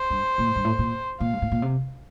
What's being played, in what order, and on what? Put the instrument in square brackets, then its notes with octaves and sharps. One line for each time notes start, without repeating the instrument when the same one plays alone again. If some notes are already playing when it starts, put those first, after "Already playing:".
Already playing: [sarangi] C5
[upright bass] G2
A#2
A2
G2
A2
A#2
[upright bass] A#2 [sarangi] F5
[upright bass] G2
A2
A#2
C3